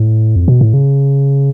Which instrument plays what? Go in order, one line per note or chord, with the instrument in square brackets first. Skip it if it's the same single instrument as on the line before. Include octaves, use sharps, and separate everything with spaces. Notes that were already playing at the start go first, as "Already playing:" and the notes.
Already playing: [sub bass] A2
F2
B2
A2
C#3